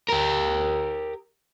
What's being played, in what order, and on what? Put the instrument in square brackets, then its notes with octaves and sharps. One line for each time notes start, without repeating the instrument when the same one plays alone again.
[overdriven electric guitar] G4 A#4